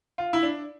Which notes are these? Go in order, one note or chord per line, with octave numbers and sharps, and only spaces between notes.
F4
E4
D4